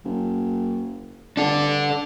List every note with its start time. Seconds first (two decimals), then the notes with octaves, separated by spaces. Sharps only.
0.04 F#1
1.37 G2 D4 A4